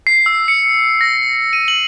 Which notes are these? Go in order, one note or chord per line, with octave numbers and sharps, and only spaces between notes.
C7
E6
C#7
A#6
D#7
F#7